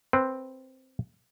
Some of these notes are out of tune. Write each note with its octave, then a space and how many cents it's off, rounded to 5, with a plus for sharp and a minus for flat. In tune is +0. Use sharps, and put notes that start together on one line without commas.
C4 +0 B4 -5